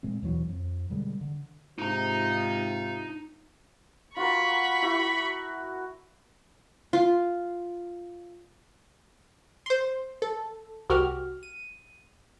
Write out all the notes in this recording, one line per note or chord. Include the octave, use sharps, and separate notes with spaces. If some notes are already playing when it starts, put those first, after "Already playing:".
A#2 G#3 A3 C4
D#2 B2 E3 F#3
F2
B2 D3 G3 G#3
D3
G#2 C3 D#4 F4 A#5
F4 F#4 A#4 B5 C#6
E4 F#4
F4
C5 C6
A4
C2 F#4 G4 F6
D#7